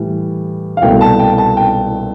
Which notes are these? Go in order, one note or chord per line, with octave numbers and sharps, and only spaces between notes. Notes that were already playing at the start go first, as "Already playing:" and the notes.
Already playing: A2 E3 G3
F5
C2 B2 A3 G5
A5
G5
A5
G5